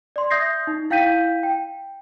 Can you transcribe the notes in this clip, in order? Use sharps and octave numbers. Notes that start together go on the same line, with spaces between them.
D5 C6
E5 D#6 G6 G#6 A#6 C7
D#4
E4 F5 G5 G6 B6 D#7
G5